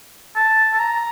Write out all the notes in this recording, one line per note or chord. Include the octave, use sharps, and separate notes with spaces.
A5
A5
A#5